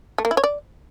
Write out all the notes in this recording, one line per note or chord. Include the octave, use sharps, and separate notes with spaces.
A3
A#3
E4
C#5
D5